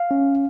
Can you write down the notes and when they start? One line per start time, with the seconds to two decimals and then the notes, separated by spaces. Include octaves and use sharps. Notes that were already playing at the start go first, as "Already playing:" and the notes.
Already playing: F5
0.11 C#4